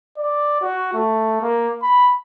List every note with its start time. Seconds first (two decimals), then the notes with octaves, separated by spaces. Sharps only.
0.17 D5
0.61 F#4
0.94 A3
1.41 A#3
1.82 B5